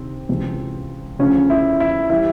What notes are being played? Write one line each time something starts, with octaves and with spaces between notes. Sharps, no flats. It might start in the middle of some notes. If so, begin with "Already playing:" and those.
Already playing: D2 C3 D#3 C4
C#2 C3 E3
D2 C#3 F3 C#4
E4
E4
E3 G3 E4